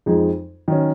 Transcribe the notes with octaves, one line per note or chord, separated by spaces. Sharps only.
F2 F3 G#3 D#4 G#4
D#3 F#3 C#4